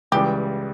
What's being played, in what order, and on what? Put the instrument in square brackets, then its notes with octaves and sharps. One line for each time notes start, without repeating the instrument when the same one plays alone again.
[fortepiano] C#2 C#3 E3 G3 [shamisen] G4